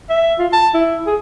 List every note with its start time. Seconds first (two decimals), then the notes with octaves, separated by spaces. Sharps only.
0.10 E5
0.39 F4
0.52 A5
0.74 E4
1.07 G#4